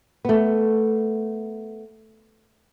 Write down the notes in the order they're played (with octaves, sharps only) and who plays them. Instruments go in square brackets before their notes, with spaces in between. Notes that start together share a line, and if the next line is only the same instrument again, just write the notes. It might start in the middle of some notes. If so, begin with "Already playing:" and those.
[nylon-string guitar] A3 B3